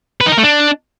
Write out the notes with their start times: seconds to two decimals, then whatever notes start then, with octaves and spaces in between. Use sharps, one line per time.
0.21 B4
0.26 D#4
0.32 A#4
0.38 A3
0.43 D4